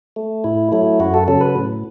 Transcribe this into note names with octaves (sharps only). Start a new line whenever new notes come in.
A3
A2 E4
F#3 A3 E4
F#2 F#4
A4
C#3 F#3 A4
B4
A2